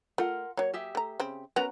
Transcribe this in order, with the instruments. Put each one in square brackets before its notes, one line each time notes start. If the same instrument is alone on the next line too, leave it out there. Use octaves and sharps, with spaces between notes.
[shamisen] A3 [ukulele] F4 A#4 F#5
[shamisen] F#3 A#3 [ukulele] C#5
[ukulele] G4 G#4 E5
[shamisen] A3 A#5
C#3 C4
[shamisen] B3 C#4 F#4 [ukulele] A#4 B4 A#5